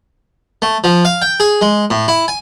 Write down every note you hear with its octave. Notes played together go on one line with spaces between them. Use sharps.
A3
F3
F5
G5
G#4
G#3
A2
E4
G#5